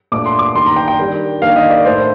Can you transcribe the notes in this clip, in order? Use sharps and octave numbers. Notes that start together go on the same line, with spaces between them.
A#2 A3 D4 D6
C6
D6
D#3 A#3 D4 C6
A#5
G5
G5
D#3 G3 D4
D#3 A#3 D4 F5
D#5
D5
A2 A3 D4 C5